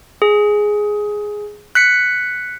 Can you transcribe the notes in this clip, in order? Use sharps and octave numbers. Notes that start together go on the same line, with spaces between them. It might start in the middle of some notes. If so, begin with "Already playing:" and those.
G#4
F#6 B6 C#7